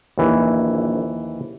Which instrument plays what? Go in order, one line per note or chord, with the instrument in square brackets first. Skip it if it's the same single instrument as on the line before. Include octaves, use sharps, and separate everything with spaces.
[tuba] A#1 [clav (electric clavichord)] D#2 E3